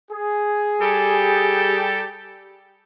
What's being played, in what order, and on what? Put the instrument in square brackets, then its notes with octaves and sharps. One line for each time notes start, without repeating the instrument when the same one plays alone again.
[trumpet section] G#4
[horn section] G3 G4 A4